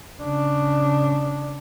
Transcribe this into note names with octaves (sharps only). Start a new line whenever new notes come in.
C#3 D4